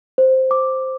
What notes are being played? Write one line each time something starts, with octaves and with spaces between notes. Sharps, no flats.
C5
D6